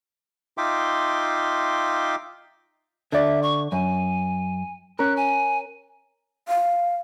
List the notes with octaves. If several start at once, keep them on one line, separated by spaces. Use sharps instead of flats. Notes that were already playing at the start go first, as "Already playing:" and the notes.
D#4 F4 E5 G5 C6 D6
D3 D5 E5
C#6
F#2 G#5
C#4 A#4 F#6
G#5
F5